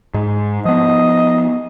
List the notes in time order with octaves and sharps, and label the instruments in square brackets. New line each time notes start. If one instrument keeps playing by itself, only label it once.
[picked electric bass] G#2 G#3
[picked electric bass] F3 B3 [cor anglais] D#5